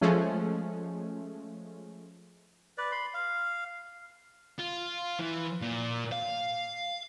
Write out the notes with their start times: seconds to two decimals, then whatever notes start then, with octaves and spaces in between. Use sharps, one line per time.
0.01 F3 G#3 A3 C#4
2.78 B4 D5
2.91 B5 C6
3.14 F5
4.59 F4
5.19 E3
5.61 A#2
6.12 F5